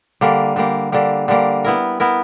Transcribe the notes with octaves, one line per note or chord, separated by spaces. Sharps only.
D3 G3 A#3
D3 G3 A#3
D3 G3 A#3
D3 G3 A#3
B3 E4 A#4
B3 E4 A#4